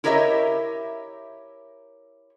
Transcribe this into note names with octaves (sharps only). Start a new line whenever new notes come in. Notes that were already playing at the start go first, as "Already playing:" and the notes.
E4 G4 A#4 C#5 D#5 E5